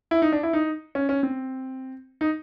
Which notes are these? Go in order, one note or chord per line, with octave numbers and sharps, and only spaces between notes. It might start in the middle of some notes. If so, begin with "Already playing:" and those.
E4
D#4
D4
E4
D#4
C#4
C#4
C4
D#4